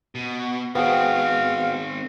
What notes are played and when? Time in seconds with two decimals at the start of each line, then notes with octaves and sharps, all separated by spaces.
0.15 B2
0.75 D#3 B3 C4 F#4 G#4 F5 G5